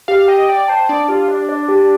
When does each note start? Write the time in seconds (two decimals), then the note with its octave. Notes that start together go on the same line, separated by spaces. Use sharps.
0.08 G4 F5
0.28 D#5 G5
0.49 D5 G5
0.68 C5 A5
0.89 D4 D5
1.08 F4 G4
1.28 D4 D5
1.49 D5
1.69 G4